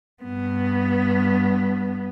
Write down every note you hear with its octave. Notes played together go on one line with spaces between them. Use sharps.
G2 B3